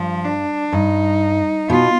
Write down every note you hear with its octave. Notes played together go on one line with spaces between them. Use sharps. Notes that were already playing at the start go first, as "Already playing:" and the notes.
Already playing: G2 F3
D4
G2 D#4
B2 F4